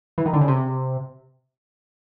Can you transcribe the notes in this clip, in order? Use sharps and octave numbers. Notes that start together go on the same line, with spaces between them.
E3
D#3
D3
C#3
C3